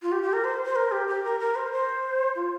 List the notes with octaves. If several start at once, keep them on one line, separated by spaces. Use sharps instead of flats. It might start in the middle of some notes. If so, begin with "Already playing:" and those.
F4
G4
G4
A#4
C5
C5
A#4
G4
G4
A#4
A#4
C5
C5
F4